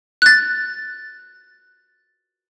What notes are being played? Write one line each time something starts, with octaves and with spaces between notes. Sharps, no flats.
F#6 A6